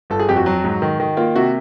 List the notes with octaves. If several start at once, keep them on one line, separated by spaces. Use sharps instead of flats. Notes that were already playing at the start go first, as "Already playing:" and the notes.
G1 A4
G#4
F2 G4
F#4
F#3
G#2
D#3
D#3
A#3 F4
C3 F#4